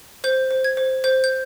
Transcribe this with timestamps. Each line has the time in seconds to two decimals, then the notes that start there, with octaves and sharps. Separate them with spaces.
0.24 C5 G6
0.51 C5
0.64 G#6
0.77 C5
1.04 C5 G6
1.24 G6